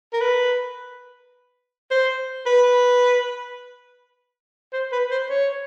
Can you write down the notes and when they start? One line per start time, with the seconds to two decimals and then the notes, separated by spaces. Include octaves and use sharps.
0.13 A#4
0.21 B4
1.91 C5
2.46 B4
4.73 C5
4.92 B4
5.11 C5
5.30 C#5